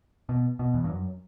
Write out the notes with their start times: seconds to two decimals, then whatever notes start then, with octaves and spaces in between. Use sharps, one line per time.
0.29 B2
0.59 B2
0.74 E2
0.84 G2
0.90 F#2